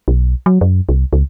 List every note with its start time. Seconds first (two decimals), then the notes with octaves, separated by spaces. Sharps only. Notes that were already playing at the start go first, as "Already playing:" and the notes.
0.08 B1
0.46 F#3
0.61 F#2
0.89 C2
1.13 C#2